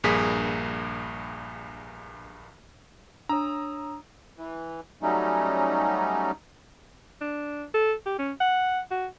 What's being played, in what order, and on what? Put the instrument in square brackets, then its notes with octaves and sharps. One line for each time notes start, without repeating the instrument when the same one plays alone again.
[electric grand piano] A#1 G2 A#3 G#4 B6
[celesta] D4 [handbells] C#5 D#6 E6 [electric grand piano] A#5
[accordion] E3
F#3 G3 A3 C#4 D#4
[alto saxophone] D4
A4
G4
C#4
F#5
F#4